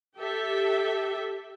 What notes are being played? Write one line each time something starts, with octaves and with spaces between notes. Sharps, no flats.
G4 A4 E5